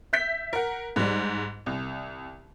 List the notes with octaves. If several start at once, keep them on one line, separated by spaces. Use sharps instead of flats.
E5 G6 B6
A#4 F#5
G#2 G3
C2